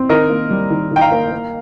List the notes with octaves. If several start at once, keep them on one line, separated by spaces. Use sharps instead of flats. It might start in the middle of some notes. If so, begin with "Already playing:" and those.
Already playing: C4
D#3 A#4 D#5
A#3
G3
D#3
D#3 G5
F5 A#5
A#3
A#3